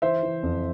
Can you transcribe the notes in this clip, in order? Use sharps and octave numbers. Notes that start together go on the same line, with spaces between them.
E3 C5 E5
E3
F2